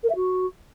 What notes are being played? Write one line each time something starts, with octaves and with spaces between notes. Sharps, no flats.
A#4
E5
F#4